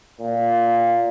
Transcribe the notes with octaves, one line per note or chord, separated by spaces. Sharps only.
A#2